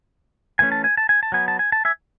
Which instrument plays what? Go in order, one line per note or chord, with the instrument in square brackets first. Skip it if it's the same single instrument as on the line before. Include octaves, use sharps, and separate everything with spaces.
[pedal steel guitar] E3 A3 C#4 G#5
A5
G#5
A5
G#5
A5
F#3 B3 G#5
A5
G#5
A5
E5 G#5